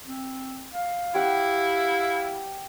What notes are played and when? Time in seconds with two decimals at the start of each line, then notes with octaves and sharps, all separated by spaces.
0.05 C4
0.73 F5
1.15 E4 G4 F#5